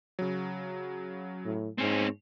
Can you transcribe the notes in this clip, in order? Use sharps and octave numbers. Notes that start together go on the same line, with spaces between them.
C#3 F#3
A2
G#2 C4 C#4